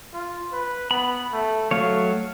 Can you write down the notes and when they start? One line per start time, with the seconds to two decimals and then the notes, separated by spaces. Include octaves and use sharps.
0.14 F4
0.53 B4
0.91 B3 B5
1.33 A3
1.71 F#3 A3 C#5 F5